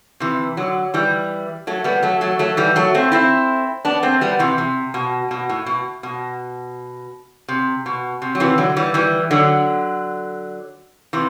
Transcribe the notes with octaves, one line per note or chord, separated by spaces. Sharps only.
C3 E3
D3 F#3
E3 G3
F#3 A3
G3 B3
F#3 A3
F#3 A3
F#3 A3
E3 G3
F#3 A3
A3 C4
C4 E4
B3 D4
A3 C4
G3 B3
C3 E3
C3
B2
B2
A2
B2
B2
C3
B2
C3
F#3
C3 E3
D3 F#3
E3 G3
E3 G3
D3 F#3
C3 E3